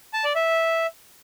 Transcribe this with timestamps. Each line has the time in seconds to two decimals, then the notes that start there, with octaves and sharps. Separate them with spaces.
0.13 A5
0.24 D5
0.35 E5